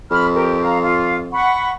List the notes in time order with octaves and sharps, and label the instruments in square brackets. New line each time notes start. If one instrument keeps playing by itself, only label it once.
[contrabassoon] F2 [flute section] B5 F6
[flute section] G4 A#4
F5 A#5
F4 F5
F#5 B5 C#6